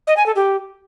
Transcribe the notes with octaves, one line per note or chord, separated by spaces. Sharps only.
D#5
G#5
A4
G4